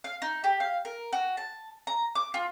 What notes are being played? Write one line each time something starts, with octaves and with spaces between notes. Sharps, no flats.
F5
D#4
G4
F5
A#4
F#4
A5
A#5
D6
F4